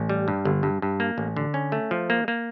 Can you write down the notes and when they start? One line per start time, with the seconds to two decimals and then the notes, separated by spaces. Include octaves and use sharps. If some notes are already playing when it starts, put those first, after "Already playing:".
Already playing: A1
0.09 G3
0.28 G2
0.45 G1
0.63 G2
0.82 G2
1.00 A#3
1.18 A1
1.37 D3
1.54 C#4
1.72 A3
1.91 F3
2.10 A#3
2.28 A#3